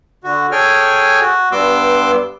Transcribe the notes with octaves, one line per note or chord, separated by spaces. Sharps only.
D3 F#4
G#4 A4 C#5 G5 G#5 F6
F#4
G2 G3 B3 C6 D6 E6